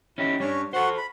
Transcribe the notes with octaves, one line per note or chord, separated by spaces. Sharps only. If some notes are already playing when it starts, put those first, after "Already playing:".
C#4 D#4 E4 G4
G3 C#4 D4 C#5
F#4 A4 C5 F#5
B5